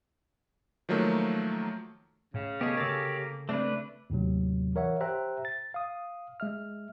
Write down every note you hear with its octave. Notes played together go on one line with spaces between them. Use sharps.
D#3 F3 F#3 A3 A#3
A2 C#3
C3 A3 B3 G4 G#4 C#5 D#5
C#3 A#3 A#4 E6 A6
G#3 A3 C4 D4 B4
D#2 A2 C3 F#3
E3 A#4 C#5 E5 F#5
G4 C5 E5 G5 A#5 F#6
A6
F5 D#6
G#3 E5 F6